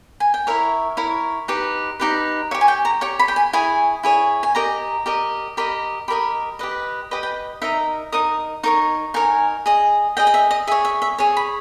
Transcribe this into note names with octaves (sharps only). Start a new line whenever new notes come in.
G#5
G5
E4 A#4 C#5 E5
E4 A#4 C#5
D#4 G4 B4
D#4 G4 B4
G4 C#5 E5
G#5
G5
A#5
G4 C#5 C#6
B5
G5
G#5
E4 G#4 C#5 G#5
E4 G#4 C#5
G#5
G4 A#4 D#5 A#5
G4 A#4 D#5
G4 A#4 D#5 B5
G4 A#4 D#5 B5
G4 B4 D#5
G4 B4 D#5
G5
D#4 A#4 D#5 E5
D#4 A#4 D#5 D#6
D#4 A#4 C#5 C#6
D#4 A#4 C#5 G#5
G#4 D#5
G#4 D#5 G5
G5
E5
D#5
G#4 C#5 E5
E5
E5
G#4 C#5
B5